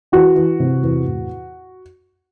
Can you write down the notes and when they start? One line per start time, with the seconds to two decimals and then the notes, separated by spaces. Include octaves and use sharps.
0.12 E3 F#4
0.36 E3
0.60 C3
0.83 E2
1.06 A2